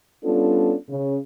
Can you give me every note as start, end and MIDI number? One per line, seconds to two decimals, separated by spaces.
0.25 0.74 55
0.25 0.74 59
0.25 0.74 61
0.25 0.74 62
0.25 0.74 65
0.25 0.74 69
0.89 1.17 49